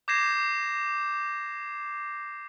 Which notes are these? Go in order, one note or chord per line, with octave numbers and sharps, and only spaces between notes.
D6 G6 G#6 A#6 C7 E7